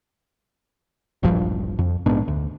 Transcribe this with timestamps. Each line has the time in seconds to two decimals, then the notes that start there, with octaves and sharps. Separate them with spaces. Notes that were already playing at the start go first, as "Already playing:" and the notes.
1.23 E1 A#1 G2 F3
1.79 F2
2.06 A#1 G#2 B3 D4
2.28 D2